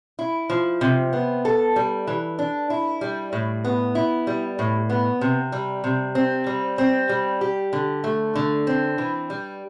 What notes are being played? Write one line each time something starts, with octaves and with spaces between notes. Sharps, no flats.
E4
F3
C3
B3
A4
G3
E3
D4
E4
G3
A2
B3
E4
G3
A2
B3
C3
G3
C3
C4
G3
C4
G3
G4
D3
A3
D3
C4
E3
G3